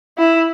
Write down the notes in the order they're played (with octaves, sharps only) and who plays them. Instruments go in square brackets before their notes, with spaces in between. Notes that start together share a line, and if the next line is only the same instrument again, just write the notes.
[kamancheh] E4